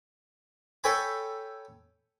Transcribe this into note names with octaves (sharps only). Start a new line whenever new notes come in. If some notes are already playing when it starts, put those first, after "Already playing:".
A4 C#5 G5 G#5 B5